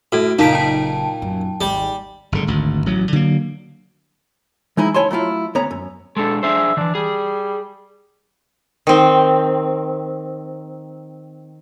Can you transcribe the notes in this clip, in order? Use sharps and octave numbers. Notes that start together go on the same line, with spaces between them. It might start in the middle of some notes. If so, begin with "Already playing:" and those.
A2 F#4 A4
F#1 A#2 D#4 F5 A5 B6 D7
G5 A5
F#2
G#1 D#2 G3
F#1 G#2 D3
G#1 D2
A1 F#3
D3 F#3 A#3
E3 G#3 D#4 E4
C#2 E4 C#5 G#5 A5 C6
F#3 A3 E4 F4
D2 B3 C#4 C#5 A#5
F#2
G#3 D4 A4
D4 G#4 C5 E5
D#3 E3 D4
G3 G#4
D#3 C4